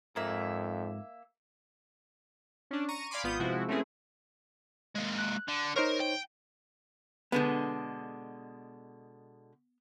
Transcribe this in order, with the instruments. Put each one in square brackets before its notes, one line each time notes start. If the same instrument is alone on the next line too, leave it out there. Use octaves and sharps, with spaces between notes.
[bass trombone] F2 [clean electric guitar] G#2 A#5 [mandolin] A#3 E5
[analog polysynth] C#4 D4
A#5 C#6 D#7
D5 F5 G#5 B5 C6 D6
G#1 B3 F4 D#6 G6
C3 F3 G#3 E4 F#4
A3 C4 C#4 E4 G#4 B4
[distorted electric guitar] G#3 A#3
[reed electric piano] F#6
[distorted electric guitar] D3
[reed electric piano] D#4 C5 C#5 [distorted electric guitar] A#4
[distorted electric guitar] G5
[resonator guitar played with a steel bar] B2 D3 G#3 [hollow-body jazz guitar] B3